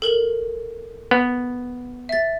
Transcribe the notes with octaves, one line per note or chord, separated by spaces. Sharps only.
A4 A#4 F#7
B3
E5 A6